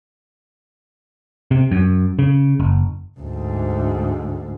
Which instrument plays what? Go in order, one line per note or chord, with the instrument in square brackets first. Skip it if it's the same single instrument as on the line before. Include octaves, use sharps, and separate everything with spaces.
[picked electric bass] C3
F#2
C#3
F#1
[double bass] D2 G#2